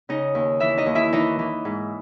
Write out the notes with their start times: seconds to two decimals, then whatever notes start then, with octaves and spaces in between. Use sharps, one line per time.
0.09 C#3 D#4 D#5
0.35 D#2
0.60 E3 E4 E5
0.77 D#4 D#5
0.86 D#2
0.95 E4 E5
1.13 E3 D#4 D#5
1.39 E3
1.65 G#2